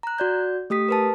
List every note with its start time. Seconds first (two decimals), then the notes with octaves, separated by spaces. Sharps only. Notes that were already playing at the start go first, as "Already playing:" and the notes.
0.03 A#5 F#6
0.18 F#4 D5 G6
0.70 A3 G4 D#6 B6
0.89 A#4 B4 A5